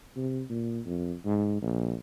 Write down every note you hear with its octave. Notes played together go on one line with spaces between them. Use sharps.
C3
A#2
F2
G#2
A#1